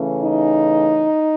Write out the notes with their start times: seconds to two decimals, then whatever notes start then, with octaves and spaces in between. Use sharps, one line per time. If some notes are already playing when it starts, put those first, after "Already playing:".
Already playing: C#3 E3 A3 C#4
0.23 D#4